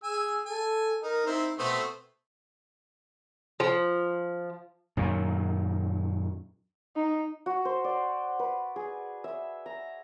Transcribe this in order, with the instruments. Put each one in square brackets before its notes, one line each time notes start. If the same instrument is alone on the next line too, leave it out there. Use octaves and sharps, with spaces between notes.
[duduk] G#4 [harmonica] G#5 E6
[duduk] A4 [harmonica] G#5
[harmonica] D#4 [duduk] A#4
[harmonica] C4 E4 [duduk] D#4
[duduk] B2 [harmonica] A3 B3 C4
[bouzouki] F3
[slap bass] F#2 A#2 D#3
[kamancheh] D#4
[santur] F#4
C5
D5
B4
G#4
E5
A#5